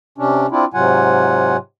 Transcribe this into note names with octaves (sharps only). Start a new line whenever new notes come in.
C3 C#4 D4
C4 D4 E4 F4
G#2 C3 F#3 F4 F#5 G#5